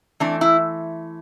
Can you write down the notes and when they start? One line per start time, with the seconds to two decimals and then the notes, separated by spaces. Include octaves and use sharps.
0.20 E3 A3 C4 D4
0.41 E4